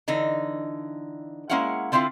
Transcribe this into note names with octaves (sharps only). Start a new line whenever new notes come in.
D3 E3 D#4
G#3 A#3 C#4 E4 F5 F#5
D3 C4 E4 F4 F5